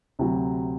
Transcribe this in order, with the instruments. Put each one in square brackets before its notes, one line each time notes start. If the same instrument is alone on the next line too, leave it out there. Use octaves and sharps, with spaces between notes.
[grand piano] D2 C3 F#3